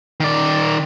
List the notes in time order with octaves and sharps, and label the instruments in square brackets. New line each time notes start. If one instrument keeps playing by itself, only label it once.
[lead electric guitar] D#3 D5